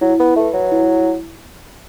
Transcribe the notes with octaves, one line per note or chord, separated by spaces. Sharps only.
F#3 E4
B3
A3 B4 E5
F#3
E4